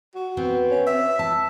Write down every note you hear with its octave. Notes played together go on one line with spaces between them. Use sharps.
F#4
B3 C4
C#4
E5
A5